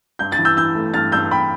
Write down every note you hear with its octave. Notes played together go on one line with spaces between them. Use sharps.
G2 G6
A6
E3
E6 G6
E3 E6 G6
A3
G2 F6 A6
G2 E6 G6
G2 G5 B5